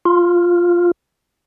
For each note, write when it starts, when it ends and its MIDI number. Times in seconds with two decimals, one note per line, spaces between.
0.05 0.91 65